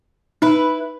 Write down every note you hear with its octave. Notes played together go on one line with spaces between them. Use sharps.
D#4 E4 B4